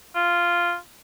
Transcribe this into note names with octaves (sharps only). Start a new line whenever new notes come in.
F4